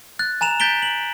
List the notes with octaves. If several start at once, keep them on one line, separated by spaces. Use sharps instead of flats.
F#6 A6
G#5 A#5 E7 F7
G6 A6 B6 D7 G7
F#7